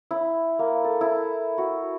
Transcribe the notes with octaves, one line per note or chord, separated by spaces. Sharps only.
E4
A#3
A4
E4
F#4